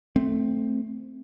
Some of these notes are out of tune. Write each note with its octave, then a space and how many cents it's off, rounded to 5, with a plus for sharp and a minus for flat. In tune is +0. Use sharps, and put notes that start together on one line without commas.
A3 +0 C4 +0